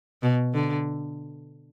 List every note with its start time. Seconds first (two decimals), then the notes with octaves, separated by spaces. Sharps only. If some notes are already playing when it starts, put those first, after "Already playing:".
0.22 B2
0.54 D3